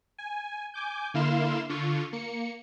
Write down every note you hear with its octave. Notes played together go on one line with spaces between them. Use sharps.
G#5
G#5 D6 G6
D3 A#3 E4 F5 C6 E7
D3 F4 C#6
A#3 C#7